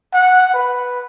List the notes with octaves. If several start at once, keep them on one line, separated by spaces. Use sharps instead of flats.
F#5
B4